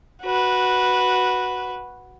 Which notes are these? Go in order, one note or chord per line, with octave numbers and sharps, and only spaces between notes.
F#4 B4